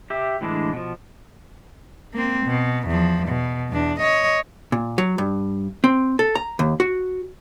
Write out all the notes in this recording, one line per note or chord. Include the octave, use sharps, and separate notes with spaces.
G4 E5
A2 D3 E3 G#3 D4
B2 F3
A#3 C4
B2
E2 F3
B2
E2 D4
C#5 D#5
A#2
F#3
G2
C4
A4
A#5
D#2
F#4